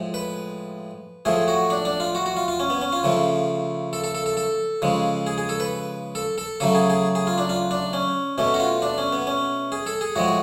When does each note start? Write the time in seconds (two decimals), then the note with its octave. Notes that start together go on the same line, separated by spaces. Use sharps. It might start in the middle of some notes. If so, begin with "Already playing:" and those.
Already playing: A2 F3 G#3
0.14 B4
1.25 A2 F3 A3 G#4
1.48 F#4
1.70 D4
1.85 D4
2.00 F4
2.15 F#4
2.26 F#4
2.37 F4
2.48 F4
2.60 C#4
2.70 B3
2.81 C#4
2.93 F4
3.03 C#3 F3 A3
3.93 A4
4.04 A4
4.15 A4
4.26 A4
4.37 A4
4.82 C#3 F3 G#3
5.27 G#4
5.38 G#4
5.49 A4
5.60 B4
6.15 A4
6.38 A4
6.60 C#3 F#3 A3 A4
6.75 G#4
6.90 G#4
7.15 G#4
7.27 F4
7.38 D4
7.49 F4
7.71 D4
7.93 C#4
8.38 B2 A3 C#4
8.54 F#4
8.60 F4
8.82 D4
8.98 C#4
9.13 B3
9.27 C#4
9.72 G#4
9.86 A4
10.01 G#4
10.16 A2 F3 G#3 F#4